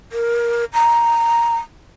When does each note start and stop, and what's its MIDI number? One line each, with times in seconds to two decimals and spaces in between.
0.12 0.65 70
0.73 1.56 82